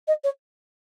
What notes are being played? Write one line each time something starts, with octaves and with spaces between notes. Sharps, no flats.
D#5
C#5